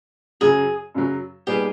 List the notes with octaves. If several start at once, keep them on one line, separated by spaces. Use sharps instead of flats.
F#2 C#3 F#3 G#4
F#2 C#3 F#3
A#2 G3 B3 D#4 G4 G#4